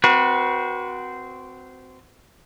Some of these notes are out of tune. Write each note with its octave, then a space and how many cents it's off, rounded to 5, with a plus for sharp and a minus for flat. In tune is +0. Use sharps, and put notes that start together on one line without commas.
C4 -15 F#4 +0 B4 -40